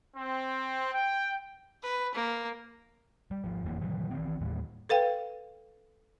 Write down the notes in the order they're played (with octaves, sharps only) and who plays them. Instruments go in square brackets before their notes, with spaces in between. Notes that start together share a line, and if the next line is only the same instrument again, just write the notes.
[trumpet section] C4
G5
[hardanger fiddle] B4
A#3
[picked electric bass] G3
G#1 F3
F#1 F2 E3 A#3
A#2 D#3 E3 F#3
D#3 E3 A#3 C4
D#2 A2 G3 A#3
[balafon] A4 B4 F5 G5